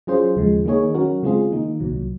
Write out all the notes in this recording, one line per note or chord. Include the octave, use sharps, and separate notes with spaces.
F#3 C#4 F4 G#4 C5
D#2 C#3 F3 G#3
D#3 A#3 D#4 G#4 C#5
F#3 C#4 F#4 A#4
C#3 G#3 C4 F4 G#4
D#3 A#3 D#4
C2 A#2 F#3